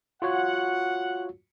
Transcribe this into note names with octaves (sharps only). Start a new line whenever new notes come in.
F4 F#4 C#5 F#5